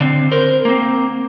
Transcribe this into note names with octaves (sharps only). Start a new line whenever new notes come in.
D3 C4
A#4 C5
A#3 C4